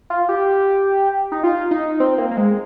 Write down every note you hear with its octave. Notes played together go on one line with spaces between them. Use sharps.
F4
G4
D#4
F4
D#4
C4
A#3
A#3
G#3